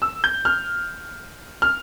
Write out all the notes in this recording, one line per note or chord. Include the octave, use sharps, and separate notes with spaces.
E6
G6
F6
F6